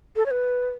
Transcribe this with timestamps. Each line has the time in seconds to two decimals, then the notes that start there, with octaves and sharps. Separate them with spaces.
0.16 A4
0.26 C#5
0.31 B4